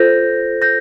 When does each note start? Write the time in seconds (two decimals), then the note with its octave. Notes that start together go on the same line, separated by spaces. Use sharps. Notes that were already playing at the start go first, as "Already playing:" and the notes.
Already playing: F4 A4 C5 G6 A#6
0.62 G6 A#6